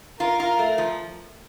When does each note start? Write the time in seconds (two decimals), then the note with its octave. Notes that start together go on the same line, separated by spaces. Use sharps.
0.20 F4 A#4
0.40 F4
0.59 A3
0.78 F3